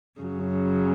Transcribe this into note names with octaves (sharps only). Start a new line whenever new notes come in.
F#2 C#3 F#3